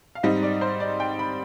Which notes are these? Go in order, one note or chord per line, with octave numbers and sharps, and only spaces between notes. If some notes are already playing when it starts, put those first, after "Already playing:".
F5
G#2 G3 C4 D#4 D#5
D5
C5
D5
G5
B5